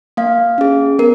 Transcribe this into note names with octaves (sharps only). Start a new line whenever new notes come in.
A#3 F5
C#4 G#4
B3 A#4